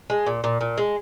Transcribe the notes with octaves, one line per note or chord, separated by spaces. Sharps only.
G#3
A#2
A#2
A#2
G#3